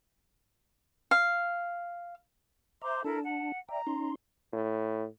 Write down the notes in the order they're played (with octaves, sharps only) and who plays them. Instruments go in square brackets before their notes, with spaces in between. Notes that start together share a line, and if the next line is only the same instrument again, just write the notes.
[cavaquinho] F5
[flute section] C5 C6 D6 [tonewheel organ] E5 A#5
[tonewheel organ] D4 A5 [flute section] E4 A4 A#4
[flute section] F#5
[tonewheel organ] D5 E5 G5 [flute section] A#5
[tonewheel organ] C#4 D#4 C6
[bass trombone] A2